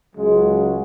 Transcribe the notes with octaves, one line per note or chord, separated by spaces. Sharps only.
C#2 C#3 F#3 G#3